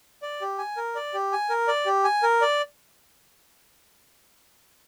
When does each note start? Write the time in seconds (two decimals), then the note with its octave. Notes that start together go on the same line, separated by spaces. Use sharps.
0.22 D5
0.41 G4
0.58 G#5
0.77 A#4
0.95 D5
1.14 G4
1.32 G#5
1.50 A#4
1.68 D5
1.86 G4
2.04 G#5
2.23 A#4
2.41 D5